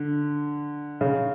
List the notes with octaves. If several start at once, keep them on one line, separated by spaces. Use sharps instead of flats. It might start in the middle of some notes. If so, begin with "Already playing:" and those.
Already playing: D3
C#3